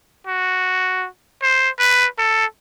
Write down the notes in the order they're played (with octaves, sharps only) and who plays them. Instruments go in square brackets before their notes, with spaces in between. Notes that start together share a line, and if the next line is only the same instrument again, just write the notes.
[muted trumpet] F#4
C5
B4
A4